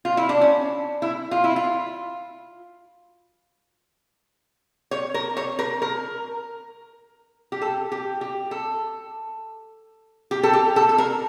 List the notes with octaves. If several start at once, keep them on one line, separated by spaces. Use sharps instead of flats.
F4
E4
D4
C#4
E4
F4
E4
F4
C#5
A#4
C#5
A#4
A#4
G4
A4
G4
G4
A4
G4
A4
G4
A4
A4
A#4